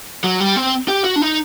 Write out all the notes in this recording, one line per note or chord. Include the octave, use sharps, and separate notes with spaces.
F#3
G3
C4
G4
F#4
D4
D#4